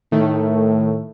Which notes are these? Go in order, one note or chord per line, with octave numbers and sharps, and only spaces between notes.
A2 D#3 A3